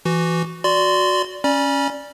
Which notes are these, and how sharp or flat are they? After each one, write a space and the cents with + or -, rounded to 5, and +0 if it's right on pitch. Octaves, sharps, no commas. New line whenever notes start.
E3 +20 F#4 +0
F#4 -10 D5 -10 C6 -20
C#4 +0 D5 +0 B5 -45